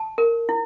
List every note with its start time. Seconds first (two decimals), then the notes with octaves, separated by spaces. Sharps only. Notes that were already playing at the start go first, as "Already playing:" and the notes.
Already playing: A5
0.18 A#4
0.49 E4